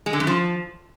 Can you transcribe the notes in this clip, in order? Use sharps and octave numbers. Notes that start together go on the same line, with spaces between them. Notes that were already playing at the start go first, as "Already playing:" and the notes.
G#3
D3
F#2
F3